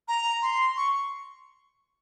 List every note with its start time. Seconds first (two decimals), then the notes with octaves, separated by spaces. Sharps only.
0.08 A#5
0.42 C6
0.77 C#6